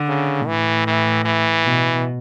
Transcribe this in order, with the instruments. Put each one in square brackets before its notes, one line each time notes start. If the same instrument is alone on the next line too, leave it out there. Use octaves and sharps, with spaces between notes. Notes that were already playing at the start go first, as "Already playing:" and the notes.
Already playing: [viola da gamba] D3
[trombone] C#3
[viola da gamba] A2 [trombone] E3
[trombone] E3
E3
[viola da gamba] B2